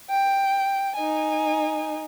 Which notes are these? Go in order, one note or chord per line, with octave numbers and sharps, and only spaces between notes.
G5
D#4 G#5